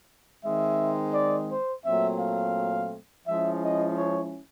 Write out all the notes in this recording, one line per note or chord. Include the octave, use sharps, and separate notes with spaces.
D#3 G#3 C4 D#4 E5
D5
C5
A#2 F#3 A3 C4 E5
F5
F3 G#3 C#4 E4 E5
D#5
C#5